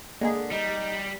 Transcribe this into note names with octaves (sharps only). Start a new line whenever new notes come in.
D3 G#3 A#3 G#4
G3 D#4